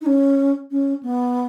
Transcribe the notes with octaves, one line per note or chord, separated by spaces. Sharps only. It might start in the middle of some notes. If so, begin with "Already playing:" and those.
D#4
C#4
C#4
B3